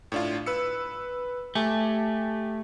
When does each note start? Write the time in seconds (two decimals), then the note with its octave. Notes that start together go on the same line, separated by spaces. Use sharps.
0.12 A2 D4 F4
0.46 B4 E6 C#7
1.55 A3 G4 G#5 A5